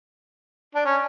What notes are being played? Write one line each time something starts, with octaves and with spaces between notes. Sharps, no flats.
D4
C#4